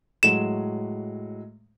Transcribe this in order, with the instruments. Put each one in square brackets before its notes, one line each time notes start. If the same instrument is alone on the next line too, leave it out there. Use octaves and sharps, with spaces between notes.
[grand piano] A2 F#3 G#3 [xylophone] E7